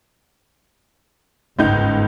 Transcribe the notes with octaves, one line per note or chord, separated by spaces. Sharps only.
G1 C#2 G#2 D#4 G6